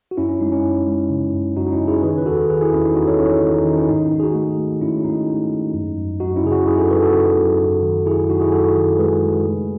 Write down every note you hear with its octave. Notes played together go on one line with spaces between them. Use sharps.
F#4
F#2 C#4 E4
C#4
G#3 D#4
C#4 E4
F#2
G#3
C#3
F#2
F#2 D#4 F#4
D#4
C#4 E4
C#3
E4 G#4
C#5
D#3 G#4 B4
B4
E2 F#4 A4
D#3 G#4 B4
E4 G#4
E2 C#4 E4
D#4
E2 D#4 F#4
A4 C#5
E2 C#4 E4
D#4
D#3 C#4
D#4
D#3 D#4
C#4 E4
G#2 D#4
D#4
G#2 D#4
G#4
D#4 F#4
A3
A3
G#2 C#4 E4
G#2 D#4
A3
G#2
F#2
F#2
F#2 D#4 F#4
C#4 E4
C#3 G#4
D#4 F#4
F#2 E4 G#4
F#4 A4
F#2 G#4 B4
F#4 A4
C#3
F#2
F#2
D#3
F#2 E4 G#4
F#2 D#4 F#4
E4 G#4
F#2 F#4 A4
D#3
G#3 G#4 B4
G#3
A3